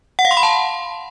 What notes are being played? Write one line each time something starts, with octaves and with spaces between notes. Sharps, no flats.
F#5
F5
C6
B5
A5